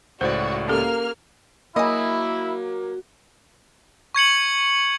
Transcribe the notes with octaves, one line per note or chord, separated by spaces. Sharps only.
C#2 A2 F#4 C5 D5
A#3 C#4 G4 A4 F6
F#3 A#3 E4 G#4 D#5
C#6 G#6 C#7 F#7